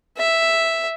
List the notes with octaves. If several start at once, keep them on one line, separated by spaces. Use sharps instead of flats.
E5